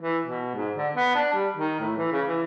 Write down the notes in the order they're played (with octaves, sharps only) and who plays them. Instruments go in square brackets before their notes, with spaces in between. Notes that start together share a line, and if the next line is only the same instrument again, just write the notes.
[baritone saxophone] E3
B2
G#2
D3
B3
D4
G3
D#3
A2
E3
C#3
E3